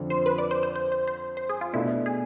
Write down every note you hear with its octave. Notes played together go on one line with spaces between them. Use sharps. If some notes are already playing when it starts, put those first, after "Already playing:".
Already playing: F2 D3 F3
C5
B4
D5
C5
C5
C5
C5
C5
C5
G#4
F4
B2 A3 D4 E4
G#4